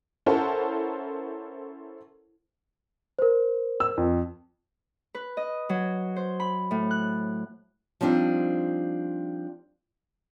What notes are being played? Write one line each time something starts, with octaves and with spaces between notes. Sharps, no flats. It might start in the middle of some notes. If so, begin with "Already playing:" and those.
C#4 E4 A4 A#4 C5 F#5
A#4 C5
E6
F2
B4
D#5
F#3
C5
B5
A2
F#6
F3 G3 C4 D4 D#4